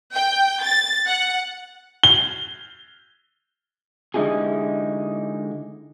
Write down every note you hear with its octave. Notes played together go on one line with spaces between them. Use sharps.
G5
A6
F#5
G7
D3 G#3 D#4 E4 G4 G#4